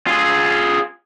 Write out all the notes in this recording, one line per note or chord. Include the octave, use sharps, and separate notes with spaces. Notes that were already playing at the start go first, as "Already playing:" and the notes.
F4 G#4